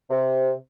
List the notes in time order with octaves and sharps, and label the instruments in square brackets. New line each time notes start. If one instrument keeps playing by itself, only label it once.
[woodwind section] C3